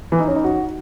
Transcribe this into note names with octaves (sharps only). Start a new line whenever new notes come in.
E3
D#4
C#4
D#4
F#4